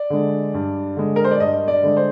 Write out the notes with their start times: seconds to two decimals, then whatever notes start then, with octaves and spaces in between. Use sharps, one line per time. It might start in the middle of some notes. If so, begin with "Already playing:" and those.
Already playing: D5
0.10 D3 G#3
0.54 G2
0.96 D3 G#3
1.16 A#4
1.24 C5
1.31 D5
1.40 G2 D#5
1.68 D5
1.83 D3 G#3
1.97 C5